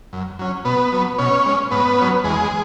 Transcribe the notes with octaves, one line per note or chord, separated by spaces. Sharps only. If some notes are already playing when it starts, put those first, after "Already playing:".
F#2
F#3 C#4
B2 B3 B4
F#3 B3
B2 C#4 C#5
G#3 C#4
G#2 B3 B4
F#3 C#4
E2 G#3 G#4